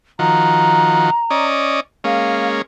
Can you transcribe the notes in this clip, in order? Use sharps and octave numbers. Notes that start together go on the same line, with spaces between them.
D#3 F3 F#4 A#5
C#4 D5 D#5
G#3 A#3 C#4 F5